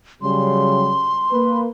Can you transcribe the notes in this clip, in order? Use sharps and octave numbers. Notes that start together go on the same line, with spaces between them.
C#3 F#3 G3 C6
A#3 B4